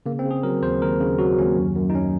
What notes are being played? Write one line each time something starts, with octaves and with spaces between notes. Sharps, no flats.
C#3 A#3
C4
C#3
G#4
F#3 A#4
D#2 C5
D#2 A#4
C#3
F#3 F#4
D#2 C#4
F#2
F#2
D#4
C#4